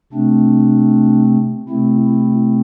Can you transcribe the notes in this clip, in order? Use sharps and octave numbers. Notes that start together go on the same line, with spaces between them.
C3 A3 C4 D4
C3 A3 C4 E4
E4